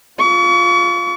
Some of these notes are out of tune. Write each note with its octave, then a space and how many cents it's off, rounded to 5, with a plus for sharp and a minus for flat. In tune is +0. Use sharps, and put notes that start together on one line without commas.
F4 +0 C#6 +40